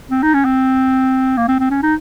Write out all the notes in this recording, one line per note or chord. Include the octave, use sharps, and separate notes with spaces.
C4
D#4
C#4
C4
A#3
C4
C4
C#4
D#4